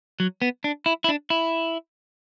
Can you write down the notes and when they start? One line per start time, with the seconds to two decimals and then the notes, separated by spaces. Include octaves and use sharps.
0.20 F#3
0.42 B3
0.64 D4
0.86 E4
1.04 E4
1.09 D4
1.30 E4